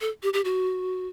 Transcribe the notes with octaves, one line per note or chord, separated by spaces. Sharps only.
A4
G4
G4
F#4